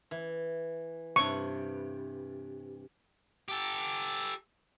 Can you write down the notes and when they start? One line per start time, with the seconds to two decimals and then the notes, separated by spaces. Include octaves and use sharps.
0.11 E3
1.16 G2 C3 C#6
3.49 G4 A4